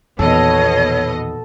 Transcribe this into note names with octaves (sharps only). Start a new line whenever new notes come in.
A#1 E2 B2 D#3 A4 C#5 D#5